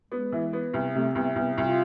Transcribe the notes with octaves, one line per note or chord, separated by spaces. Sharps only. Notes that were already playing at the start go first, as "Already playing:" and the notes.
G#3 B3
E3
B3
C2
C3 A3
C2 B3
C2 B3
C2 F4